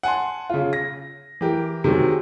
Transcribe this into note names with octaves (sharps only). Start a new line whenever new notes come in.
F#5 G#5 A5 C6
C#3 F4
A#6
E3 G4 A#4
C3 D#3 F#3 G#3